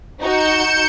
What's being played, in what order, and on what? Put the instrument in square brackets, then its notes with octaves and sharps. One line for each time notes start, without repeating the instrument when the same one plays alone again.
[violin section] D#4 F#4 [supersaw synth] G6 C#7 E7